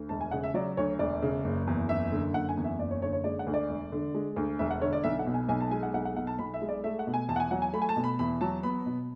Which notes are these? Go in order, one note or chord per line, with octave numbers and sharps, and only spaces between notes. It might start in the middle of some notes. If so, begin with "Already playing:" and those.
Already playing: D2
E1 A5
G#5
C#3 F#5
E5
F#3 D5
D2 C#5
E1 D5
C#3
F#1
E2
F#1 E5
D3
F#1 F#5
G#5
E2
E5
F#1 D5
C#5
D3 C#5
C#5
G#3 D5
F#5
D2
D5
E1
D3
G#3
D2
E1 E5
F#5
D3 C#5
D5
B1 E5
F#5
B2
G#5
B1 G#5
A5
G#3 G#5
F#5
B1 F#5
F#5
B2 F#5
A5
B1 B5
E5
G#3
D5
A3 E5
F#5
B2
G#5
E2 A5
F#5
G#5
F#3 F#5
G#5
A3 B5
G#5
A5
B2
B5
E2 B5
F#3 A5
B3 B5
B2